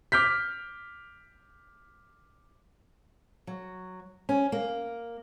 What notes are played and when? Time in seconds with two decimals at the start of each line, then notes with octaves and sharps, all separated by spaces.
0.12 D6 F6 G6 B6
3.47 F#3
4.29 C#4
4.52 A#3